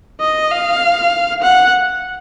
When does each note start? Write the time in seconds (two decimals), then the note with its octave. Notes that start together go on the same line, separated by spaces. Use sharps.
0.21 D#5
0.51 F5
1.42 F#5